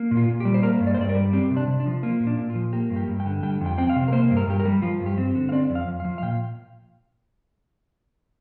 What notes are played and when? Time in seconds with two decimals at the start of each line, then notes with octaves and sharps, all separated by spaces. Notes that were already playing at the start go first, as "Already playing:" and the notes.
Already playing: A#3
0.11 A#2
0.17 F4
0.28 A#2
0.40 G4
0.45 G3
0.54 C5
0.62 A#3 A#4
0.80 G2
0.87 D5
0.94 C5
0.98 G2 D5
1.09 A#4
1.15 G3
1.33 C4 G4
1.51 C3
1.57 D4
1.68 C3
1.80 D4
1.86 F3
2.03 A#3 F4
2.20 A#2
2.27 D4
2.38 A#2
2.50 F4
2.55 F3
2.73 A#3 G4
2.90 G2
2.96 G4
3.08 G2
3.20 G5
3.26 D3
3.43 G3 G5
3.61 F2
3.66 G5
3.78 C4 G5
3.89 F5
3.96 C3
4.08 A#4
4.12 A#3 C5
4.31 G2
4.37 A#4
4.47 G2 G4
4.60 A#4
4.65 G3
4.82 F3 F4
5.00 G2
5.06 G4
5.18 C4
5.35 D3
5.49 F5
5.52 C4 D5
5.70 F2
5.75 F5
5.88 F2
6.00 F5
6.05 F3
6.18 F5
6.22 A#2 G5